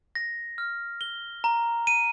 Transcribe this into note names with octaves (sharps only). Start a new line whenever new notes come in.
A#6
F6
G7
A#5
D#7